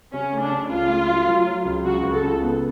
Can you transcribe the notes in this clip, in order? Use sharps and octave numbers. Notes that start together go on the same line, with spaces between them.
C#3 C#4
A3
D4
C#3
C#2 F4
A3
F#3
F#3
F#3
C#2
C#3 F#4
C#2
A4
C#3
B3